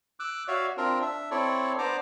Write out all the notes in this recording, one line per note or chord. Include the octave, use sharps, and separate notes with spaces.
D6 E6 F#6
F#4 C#5 D5 E5 F5
C4 D4 F4 A#4
D4 E5
C4 E4 A4 C#5 D5
B3 D4 C5 D5 A#5 D6